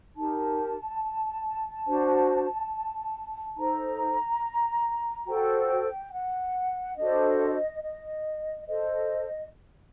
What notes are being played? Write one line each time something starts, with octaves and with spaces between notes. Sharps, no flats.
D#4 G4 A#4 A5
D4 F#4 C5
D#4 A4 C5 A#5
F#4 A4 C5 G5
F#5
D4 F#4 A4 C5 D#5
D#5
A4 C5 D#5